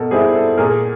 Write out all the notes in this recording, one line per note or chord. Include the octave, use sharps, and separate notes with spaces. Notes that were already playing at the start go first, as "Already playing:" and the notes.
Already playing: B2 A4 A#4
G3 C4 E4 G#4
A4
A#2 G#4 A#4